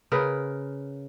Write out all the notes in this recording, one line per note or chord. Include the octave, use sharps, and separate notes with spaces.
C#3 A#4 B4